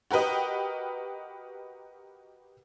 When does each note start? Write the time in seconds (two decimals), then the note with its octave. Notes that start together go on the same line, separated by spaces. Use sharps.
0.11 F#4 G4 A#4 B4 D#5